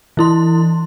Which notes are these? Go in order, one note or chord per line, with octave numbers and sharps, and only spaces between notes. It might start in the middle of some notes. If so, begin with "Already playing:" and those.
E3 E4 C6